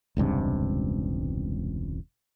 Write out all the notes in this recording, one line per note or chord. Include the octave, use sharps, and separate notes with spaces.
E1 C#2 G2 C3